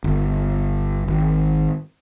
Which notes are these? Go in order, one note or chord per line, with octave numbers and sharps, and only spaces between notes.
G1
G#1